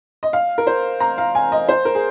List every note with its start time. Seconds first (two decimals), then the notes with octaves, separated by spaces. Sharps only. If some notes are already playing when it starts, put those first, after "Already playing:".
0.23 D#5
0.33 F5
0.58 A#4
0.67 C5
1.00 A#5
1.18 F5
1.35 G#5
1.52 D#5
1.68 C5
1.85 A#4
1.95 G#4